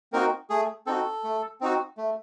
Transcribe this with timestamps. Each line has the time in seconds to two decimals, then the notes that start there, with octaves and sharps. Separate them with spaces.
0.13 A#3 C4 D#4 F#4 A#4
0.50 A3 G#4
0.87 C4 D#4 F#4 A4
1.24 A3
1.61 C4 D#4 F#4
1.97 A3